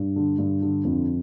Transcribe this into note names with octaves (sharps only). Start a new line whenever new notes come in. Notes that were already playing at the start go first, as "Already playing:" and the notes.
Already playing: G2
D3
G2
D3
F2